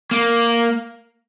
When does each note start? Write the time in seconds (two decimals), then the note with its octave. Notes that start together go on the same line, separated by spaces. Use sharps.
0.11 A#3